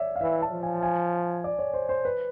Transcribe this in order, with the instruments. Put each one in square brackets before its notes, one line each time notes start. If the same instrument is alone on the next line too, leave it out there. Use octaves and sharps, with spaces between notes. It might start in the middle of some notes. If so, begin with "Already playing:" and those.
Already playing: [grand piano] C#5 D5 E5
F5
[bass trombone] E3 [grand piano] E5
[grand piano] A5
[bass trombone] F3
[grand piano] G#5
G#5
D5
C#5
C5
C5
B4